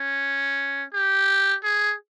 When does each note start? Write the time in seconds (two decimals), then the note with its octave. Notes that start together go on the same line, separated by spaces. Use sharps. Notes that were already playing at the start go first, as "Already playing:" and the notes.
Already playing: C#4
0.94 G4
1.63 G#4